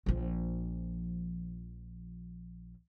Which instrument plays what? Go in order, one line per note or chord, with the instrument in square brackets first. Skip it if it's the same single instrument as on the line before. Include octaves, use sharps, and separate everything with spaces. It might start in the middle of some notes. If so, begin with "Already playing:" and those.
[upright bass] A#1 F3